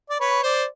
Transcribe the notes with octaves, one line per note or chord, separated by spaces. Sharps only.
D5
B4 C#5
C5 D5